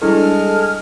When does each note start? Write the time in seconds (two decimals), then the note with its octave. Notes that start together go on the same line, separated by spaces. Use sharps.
0.02 G3 G#3 D4 E4 A4 F6